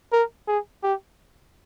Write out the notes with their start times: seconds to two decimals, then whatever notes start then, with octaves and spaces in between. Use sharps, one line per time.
0.12 A#4
0.48 G#4
0.83 G4